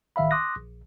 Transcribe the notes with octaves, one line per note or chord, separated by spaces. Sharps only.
A1 D#3 E5 F5 B5
C6 D6 D#6 F#6 A#6
A#1